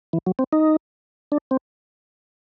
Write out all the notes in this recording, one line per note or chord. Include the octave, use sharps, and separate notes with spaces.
E3
F#3
C4
D#4
D4
C4